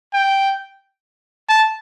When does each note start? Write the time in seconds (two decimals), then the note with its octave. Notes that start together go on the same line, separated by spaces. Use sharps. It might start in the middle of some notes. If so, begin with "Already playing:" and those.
0.14 G5
1.49 A5